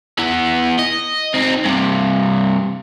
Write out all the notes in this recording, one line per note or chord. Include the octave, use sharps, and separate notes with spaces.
E3 B3
D#5
C4 D#4
G2 C3